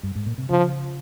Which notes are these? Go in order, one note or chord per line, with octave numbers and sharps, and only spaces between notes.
G2
G#2
A#2
C3
C#3 F3